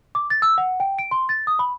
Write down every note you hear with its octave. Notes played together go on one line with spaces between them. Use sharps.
D6
A6
E6
F#5
G5
D7
C6
A6
D#6
B5